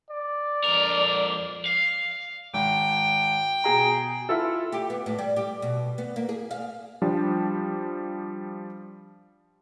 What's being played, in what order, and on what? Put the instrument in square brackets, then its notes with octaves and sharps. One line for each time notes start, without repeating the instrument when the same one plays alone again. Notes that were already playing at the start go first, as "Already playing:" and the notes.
[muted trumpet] D5
[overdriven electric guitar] F2 A#4
F5
[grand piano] G#1 [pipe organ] G5
[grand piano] B2 G#4 A#5
E4 F4 A4
[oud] G4
B3
A2
G3
G4
B2
B3
A#3
G#4
F5
[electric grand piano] F3 G3 D4